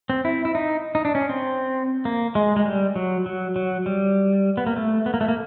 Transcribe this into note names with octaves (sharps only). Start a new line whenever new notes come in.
C4
E4
E4
D#4
D#4
D4
C#4
C4
A#3
G#3
G#3
G3
F#3
F#3
F#3
G3
B3
A#3
A3
B3
A#3
A3
A#3